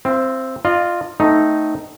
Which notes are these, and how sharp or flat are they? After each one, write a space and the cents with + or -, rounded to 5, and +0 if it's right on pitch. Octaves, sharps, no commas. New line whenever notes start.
C4 +0 F4 -45
F4 +0 D#5 -40
A3 +0 C4 -30 D#4 +0